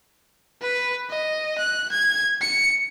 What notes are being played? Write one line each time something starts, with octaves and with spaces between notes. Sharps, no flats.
B4
D#5
F#6
G#6
C#7